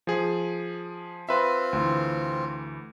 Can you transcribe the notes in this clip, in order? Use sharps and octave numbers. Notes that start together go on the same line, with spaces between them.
F3 G#4
C4 F4 B4 E5
D2 E3